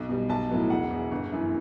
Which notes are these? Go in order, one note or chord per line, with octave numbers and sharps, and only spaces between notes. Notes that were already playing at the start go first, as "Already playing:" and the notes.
Already playing: B1
B2 G3
B1 A5
A2 F#3 B3
E1 F#5
E2 B2
G1
F#2 E3